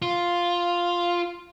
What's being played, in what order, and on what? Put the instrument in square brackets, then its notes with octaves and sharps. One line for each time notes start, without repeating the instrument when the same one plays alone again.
[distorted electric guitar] F4